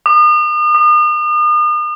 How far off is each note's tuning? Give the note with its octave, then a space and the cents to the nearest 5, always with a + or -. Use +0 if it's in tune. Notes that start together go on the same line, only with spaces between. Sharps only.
D#6 -40
D#6 -40